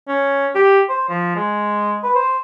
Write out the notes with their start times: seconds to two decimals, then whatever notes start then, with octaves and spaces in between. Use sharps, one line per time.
0.08 C#4
0.55 G4
0.89 C5
1.09 F3
1.36 G#3
2.03 B4
2.15 C5